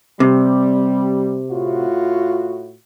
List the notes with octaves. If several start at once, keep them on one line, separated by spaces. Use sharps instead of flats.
C3 G3
A2 F4 F#4